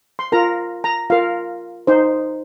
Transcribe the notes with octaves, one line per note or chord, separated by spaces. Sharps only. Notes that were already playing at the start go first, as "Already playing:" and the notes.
C6
F4 A#4 A#5
A#5
F4 A#4 F5
D#4 C5